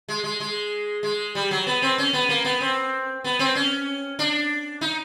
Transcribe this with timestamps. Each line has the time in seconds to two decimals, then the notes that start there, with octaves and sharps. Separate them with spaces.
0.08 G#3
0.24 G#3
0.40 G#3
1.03 G#3
1.35 G3
1.51 F#3
1.67 B3
1.82 C4
1.98 C#4
2.13 B3
2.29 A#3
2.45 B3
2.61 C4
3.24 B3
3.39 C4
3.55 C#4
4.19 D4
4.81 D#4